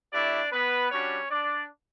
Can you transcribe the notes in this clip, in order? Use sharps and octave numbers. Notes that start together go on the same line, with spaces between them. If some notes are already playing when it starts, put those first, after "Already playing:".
A3 D4 E4 G4 D5
B3 B4
G3 C#4 D4 F#4 C#5
D4 D5